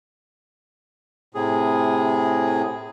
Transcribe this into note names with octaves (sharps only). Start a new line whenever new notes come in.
A2 C3 G#4